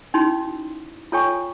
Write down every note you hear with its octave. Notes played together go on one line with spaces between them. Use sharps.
C#4 D#4 E4 F#4 C6
F4 A4 C#5 G5 G#5 C#6